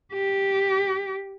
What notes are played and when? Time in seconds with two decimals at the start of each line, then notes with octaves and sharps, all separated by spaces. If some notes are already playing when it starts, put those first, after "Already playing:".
0.13 G4